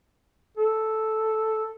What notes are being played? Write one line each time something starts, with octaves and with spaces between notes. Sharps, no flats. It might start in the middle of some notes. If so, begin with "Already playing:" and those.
A4